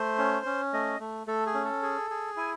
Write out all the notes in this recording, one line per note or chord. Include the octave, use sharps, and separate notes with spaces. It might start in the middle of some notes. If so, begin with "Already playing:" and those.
Already playing: A3 C5
C#4
C#4
A3 D#5
A3
A3 A4
G#4
C#4
A4
G#4
G#4
E4 G#5